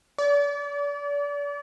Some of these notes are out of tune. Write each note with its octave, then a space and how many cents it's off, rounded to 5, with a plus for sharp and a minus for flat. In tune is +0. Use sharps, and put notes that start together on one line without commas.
D5 -35